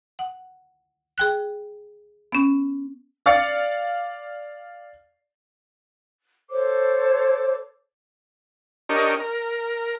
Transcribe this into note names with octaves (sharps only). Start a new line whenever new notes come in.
F#5
G#4 G5 F#6
B3 C#4
D5 F5 D6 A6 C#7
A4 C5 C#5 D6
D4 G4 A#4 C#5 D#5
A#4